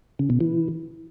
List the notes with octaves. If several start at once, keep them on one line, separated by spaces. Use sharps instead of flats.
C#3
B2
E3